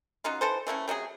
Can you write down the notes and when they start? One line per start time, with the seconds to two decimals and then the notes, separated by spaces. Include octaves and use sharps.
0.24 F#3 C#4 D#4 F4
0.41 E3 A4 C5
0.67 E3 A3 A#3 C#4
0.88 C3 F#3 D4 G#4